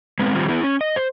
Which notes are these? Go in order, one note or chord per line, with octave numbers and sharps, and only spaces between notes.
G#3 B3 C4
D#3 G3 C4 F4
B3 E4 G#4
C#4
D#5
C5